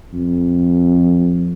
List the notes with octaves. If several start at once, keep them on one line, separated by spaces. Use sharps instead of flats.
F2